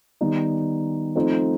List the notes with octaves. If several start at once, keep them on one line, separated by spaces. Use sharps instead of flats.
D#3 G3 B3 D#4
F3 A3 C4 D#4